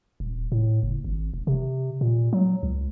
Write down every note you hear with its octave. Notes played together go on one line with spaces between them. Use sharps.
D#1
A2
F#1
G#1
E1
C3
A#2
F#3
C#2